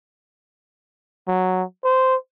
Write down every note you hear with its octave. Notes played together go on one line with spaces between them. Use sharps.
F#3
C5